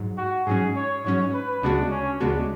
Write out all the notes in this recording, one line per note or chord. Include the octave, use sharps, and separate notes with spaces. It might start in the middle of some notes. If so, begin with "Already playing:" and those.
Already playing: G#2 F#3
F#4
G#2 F#3 C#4 G#4
C#5
G#2 F#3 C#4 C#5
B4
D2 C#3 G#3 B3 D4 F#4
C#4
D2 C#3 G#3 B3 D4 F#4